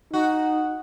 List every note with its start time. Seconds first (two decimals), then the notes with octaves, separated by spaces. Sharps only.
0.14 D#4 F#4